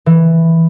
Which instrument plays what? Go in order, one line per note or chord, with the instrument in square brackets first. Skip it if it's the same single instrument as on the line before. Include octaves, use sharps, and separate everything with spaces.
[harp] E3